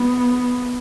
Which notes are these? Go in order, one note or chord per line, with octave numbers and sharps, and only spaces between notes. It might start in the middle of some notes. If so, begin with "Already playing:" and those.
Already playing: B3